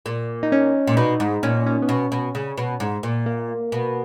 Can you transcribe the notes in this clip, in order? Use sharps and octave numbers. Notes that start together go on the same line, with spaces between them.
A#2
D#4
C#4
A#2
B2 D#4
G#2
A#2 C#4
C#4
B3
B2 C#4
B2
C#3
B2
G#2
A#2
A#3
B2